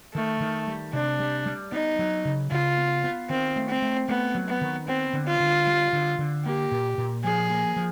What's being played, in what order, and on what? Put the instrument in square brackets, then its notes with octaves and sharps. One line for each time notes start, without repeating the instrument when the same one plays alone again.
[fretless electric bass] D#3 [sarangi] A3
[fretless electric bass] D#3
G3
[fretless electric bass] C3 [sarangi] D4
[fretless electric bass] G3
G3
[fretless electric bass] B3 [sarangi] D#4
[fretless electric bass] F#3
C#3
[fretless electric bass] C#3 [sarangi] F4
[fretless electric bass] B3
B3
[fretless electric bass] D#3 [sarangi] C4
[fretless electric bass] A3
[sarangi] C4
[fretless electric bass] A3
[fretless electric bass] A3 [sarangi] B3
[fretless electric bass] F#3
[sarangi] B3
[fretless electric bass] D#3
[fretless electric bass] B3 [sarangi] C4
[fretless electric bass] D3
[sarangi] F4
[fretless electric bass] D3
G3
D3
D3
[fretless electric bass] A#3 [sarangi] G4
[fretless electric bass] A#2
A#2
[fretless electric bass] F3 [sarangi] G#4
[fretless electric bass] A#3
F3